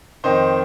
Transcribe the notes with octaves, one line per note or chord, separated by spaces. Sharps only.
F2 D#3 C5 D#5